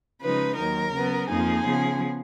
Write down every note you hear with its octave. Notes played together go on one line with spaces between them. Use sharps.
C#3 F3 G#3 D#4 B4
D#2 D#3 F#3 A#4
C#3 F#3 B3
F2 F3 A#3 D#4 G#4
C#3 F3 B3